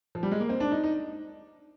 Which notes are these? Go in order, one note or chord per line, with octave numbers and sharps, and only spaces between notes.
F3
G3
G#3
A#3
C4
D4
D#4
D#4